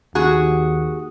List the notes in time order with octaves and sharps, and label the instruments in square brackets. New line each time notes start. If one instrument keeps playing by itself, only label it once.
[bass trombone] D#2 [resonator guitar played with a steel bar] F#4 G#4